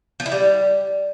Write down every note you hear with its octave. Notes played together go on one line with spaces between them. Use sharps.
F3
E4
G3